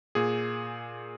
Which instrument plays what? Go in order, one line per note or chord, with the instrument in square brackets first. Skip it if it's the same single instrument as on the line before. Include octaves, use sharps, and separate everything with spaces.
[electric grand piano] A#2 G#4